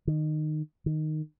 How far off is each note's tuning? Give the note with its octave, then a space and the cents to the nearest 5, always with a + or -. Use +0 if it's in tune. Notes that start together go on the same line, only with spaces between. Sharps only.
D#3 -20
D#3 -10